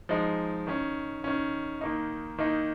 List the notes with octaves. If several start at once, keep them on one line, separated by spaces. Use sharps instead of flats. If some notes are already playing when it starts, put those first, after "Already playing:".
F3 G#3 D#4
D#3 C#4
D#3 C#4
D#3 A#3 D#4
D#3 A#3 D#4